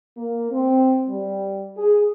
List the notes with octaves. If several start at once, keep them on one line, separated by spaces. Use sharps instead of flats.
A#3
C4
G3
G#4